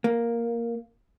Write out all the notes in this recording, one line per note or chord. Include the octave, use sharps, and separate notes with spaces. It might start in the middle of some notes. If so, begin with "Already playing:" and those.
A#3